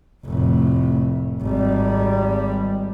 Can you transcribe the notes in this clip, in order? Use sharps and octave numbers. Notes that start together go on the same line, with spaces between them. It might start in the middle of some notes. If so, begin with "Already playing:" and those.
F1 A2
G#1 G3